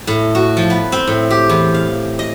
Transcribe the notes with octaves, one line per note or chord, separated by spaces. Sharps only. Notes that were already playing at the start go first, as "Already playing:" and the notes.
A2
F#4
F3
B3
C4
A2
G4
E2
F5
D#5